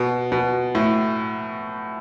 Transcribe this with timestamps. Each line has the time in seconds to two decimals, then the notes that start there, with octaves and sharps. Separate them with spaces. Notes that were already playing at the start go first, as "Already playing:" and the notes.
Already playing: B2
0.32 B2
0.75 A2